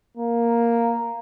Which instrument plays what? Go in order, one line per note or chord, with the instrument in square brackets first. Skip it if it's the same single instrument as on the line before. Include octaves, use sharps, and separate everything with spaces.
[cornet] A#3